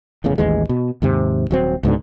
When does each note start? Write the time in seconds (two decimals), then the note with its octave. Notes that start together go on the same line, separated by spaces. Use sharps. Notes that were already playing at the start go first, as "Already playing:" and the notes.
0.24 F1 E2 A2 C#3
0.38 A1 D#2 E3 G#3
0.69 B2
1.02 D#2 G#2 C3
1.51 D#1 F#3 C4
1.83 C#2 G#2 B2 D3